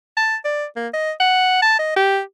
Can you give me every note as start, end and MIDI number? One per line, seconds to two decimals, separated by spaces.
0.17 0.36 81
0.45 0.65 74
0.76 0.88 58
0.94 1.11 75
1.20 1.62 78
1.62 1.76 81
1.79 1.96 75
1.96 2.20 67